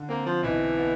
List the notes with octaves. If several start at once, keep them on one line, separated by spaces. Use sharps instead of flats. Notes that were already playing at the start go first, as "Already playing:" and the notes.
Already playing: D3
A#3 C4
F3
B1 E3
B3